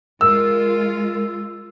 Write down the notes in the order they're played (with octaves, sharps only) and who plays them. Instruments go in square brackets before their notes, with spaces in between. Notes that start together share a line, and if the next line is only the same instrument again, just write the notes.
[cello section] G#3 F4 [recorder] A#4 [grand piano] E6